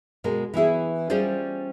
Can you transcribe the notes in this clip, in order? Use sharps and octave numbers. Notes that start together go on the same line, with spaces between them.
B2 G#3 A#4
E3 B3 E4 G#4
G3 C#4 F4 G#4 C5 D5